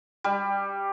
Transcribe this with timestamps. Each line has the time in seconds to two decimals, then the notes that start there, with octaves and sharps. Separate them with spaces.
0.24 G3